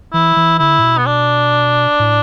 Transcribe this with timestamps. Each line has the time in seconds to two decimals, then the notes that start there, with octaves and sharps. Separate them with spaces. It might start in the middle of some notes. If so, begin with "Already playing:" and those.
0.13 E3 E4
0.36 E3
0.59 D3 E4
0.79 A2
0.83 B2
0.98 B3
1.06 D4
2.00 A2